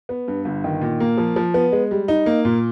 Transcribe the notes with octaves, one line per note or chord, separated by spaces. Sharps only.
B3
G2
G1
D#3
A#2
A#3
F3
F3
B3
G#3
G3
D#4
A#3
A#2